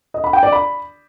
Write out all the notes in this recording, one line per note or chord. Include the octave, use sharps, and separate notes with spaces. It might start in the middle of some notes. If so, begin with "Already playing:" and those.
D#5
B5
G5
D5
B5